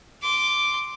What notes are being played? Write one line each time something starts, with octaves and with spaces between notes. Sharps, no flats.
C6 D6